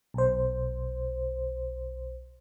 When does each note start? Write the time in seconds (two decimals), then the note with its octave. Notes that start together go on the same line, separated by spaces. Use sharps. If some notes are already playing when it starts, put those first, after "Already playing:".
0.14 B1 C5